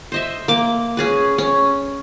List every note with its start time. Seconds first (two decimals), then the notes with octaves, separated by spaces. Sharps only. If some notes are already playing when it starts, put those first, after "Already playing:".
0.12 C5 D#5 E5
0.48 A#3 D6
0.97 C#4 G#4 B4
1.38 C#4